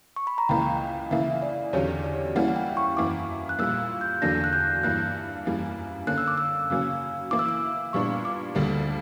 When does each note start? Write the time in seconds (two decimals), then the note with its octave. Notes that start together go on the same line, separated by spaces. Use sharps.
0.16 C#6
0.27 B5
0.38 A#5
0.49 C#2 C#3 E3 A#3 G5
1.11 C#3 E3 A#3 E5
1.42 D5
1.73 E2 D3 F#3 C#4 G4 C#5
2.04 D5
2.36 E3 G3 A#3 C#4 E4 F#5
2.48 F#5
2.56 G5
2.77 C#6
2.97 F#2 E3 A#3 E4 D6
3.49 F#6
3.59 A#2 G3 A#3 E6
4.01 G6
4.22 E2 D3 F#3 A#3 D4 A#6
4.44 F#6
4.53 G6
4.83 G2 E3 A#3 E4 F#6
5.45 F#2 E3 G3 A#3
6.07 D3 A#3 C#4 F#6
6.18 E6
6.28 D6
6.38 E6
6.70 C#3 F#3 A#3 C#4
7.31 E3 A#3 E4 D6
7.39 E6
7.49 D6
7.93 A#2 G3 B3 D4 C#6
8.25 D6
8.55 D2 D3 G3 A#3 D4